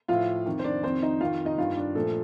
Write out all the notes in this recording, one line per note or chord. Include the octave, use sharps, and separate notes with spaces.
A2 F3 F4 F5
F2 D#3
C5
D4 D5
F2 D#3 C4 C5
D#4 D#5
F2 D#3 F4 F5
D#4 D#5
G2 D#3 F4 F5
D4 D5
A#2 F3 A3 A4